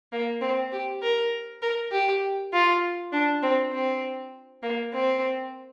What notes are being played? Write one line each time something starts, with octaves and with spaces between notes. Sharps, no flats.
A#3
C4
G4
A#4
A#4
G4
F4
D4
C4
C4
A#3
C4